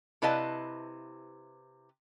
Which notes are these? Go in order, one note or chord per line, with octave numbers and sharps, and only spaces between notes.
C3 E4 B4 D#5 F5 A5